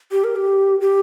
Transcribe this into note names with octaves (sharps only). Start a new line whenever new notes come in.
G4
A#4
G4
G4